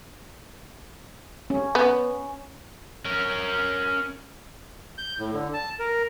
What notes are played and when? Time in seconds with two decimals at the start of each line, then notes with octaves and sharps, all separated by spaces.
1.50 C#4
1.75 B3
3.05 C#4 A#4
4.98 G6
5.19 A2
5.33 D3
5.54 A5
5.79 A#4